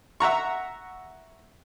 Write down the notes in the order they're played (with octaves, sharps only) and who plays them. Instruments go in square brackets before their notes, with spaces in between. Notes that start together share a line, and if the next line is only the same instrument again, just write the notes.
[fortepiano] E5 F#5 A#5 C#6